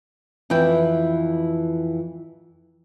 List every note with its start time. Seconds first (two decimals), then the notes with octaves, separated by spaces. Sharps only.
0.50 F2 E3 E4 G5